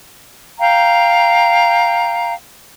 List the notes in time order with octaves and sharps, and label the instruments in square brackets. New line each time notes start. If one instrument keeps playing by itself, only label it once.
[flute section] F5 G5 A#5